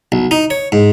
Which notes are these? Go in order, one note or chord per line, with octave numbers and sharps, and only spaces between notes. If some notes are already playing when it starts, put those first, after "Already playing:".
B1
D#4
C#5
G#2